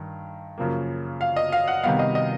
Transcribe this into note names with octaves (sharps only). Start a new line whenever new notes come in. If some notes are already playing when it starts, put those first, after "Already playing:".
Already playing: G2 D#3
F#2 C#3 F3 A#3
F5
D#5
F5
F#5
C3 D#3 G3 B3 F5
D#5
D#5